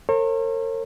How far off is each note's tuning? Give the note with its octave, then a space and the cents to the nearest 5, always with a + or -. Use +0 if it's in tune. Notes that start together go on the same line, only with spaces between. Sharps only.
A#4 -40 C#5 -40